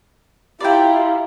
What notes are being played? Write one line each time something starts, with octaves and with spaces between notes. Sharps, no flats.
E4 F4 G4 D5 F5 G5 A#5 B5